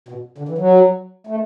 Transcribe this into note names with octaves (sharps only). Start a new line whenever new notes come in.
B2
D3
E3
F#3
A3